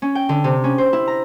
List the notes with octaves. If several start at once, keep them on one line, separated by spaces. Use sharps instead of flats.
C#4
G5
D3
C3
C#4
C5
E4
A#5